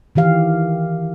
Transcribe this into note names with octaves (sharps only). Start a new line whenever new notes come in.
D#3 E3 G4 F5